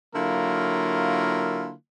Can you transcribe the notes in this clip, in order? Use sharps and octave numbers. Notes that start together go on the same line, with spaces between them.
D3 F#3 A#3 E4 F4 A#4